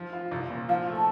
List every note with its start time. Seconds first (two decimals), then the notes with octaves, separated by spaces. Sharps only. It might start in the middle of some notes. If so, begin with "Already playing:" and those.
Already playing: F3
0.13 F4
0.31 C2
0.50 A#2
0.69 F3 F5
0.87 A3
0.96 A5